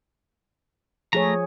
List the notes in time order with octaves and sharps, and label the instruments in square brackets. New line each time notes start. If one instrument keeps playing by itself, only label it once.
[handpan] F3 G#4 C#5 [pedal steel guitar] A3 A#5